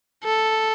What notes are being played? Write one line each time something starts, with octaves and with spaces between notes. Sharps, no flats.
A4